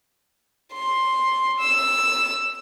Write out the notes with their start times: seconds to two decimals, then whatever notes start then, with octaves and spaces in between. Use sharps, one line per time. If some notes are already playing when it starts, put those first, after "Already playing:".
0.73 C6
1.59 E6